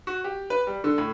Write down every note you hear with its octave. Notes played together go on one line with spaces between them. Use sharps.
F#4
G4
B4
G3
D3
A2